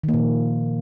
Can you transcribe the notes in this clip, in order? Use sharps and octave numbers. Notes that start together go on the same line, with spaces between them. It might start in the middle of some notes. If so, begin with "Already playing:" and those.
D#3
A#3
A#2
F3